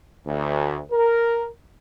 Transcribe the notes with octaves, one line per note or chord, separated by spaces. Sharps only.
D2
A#4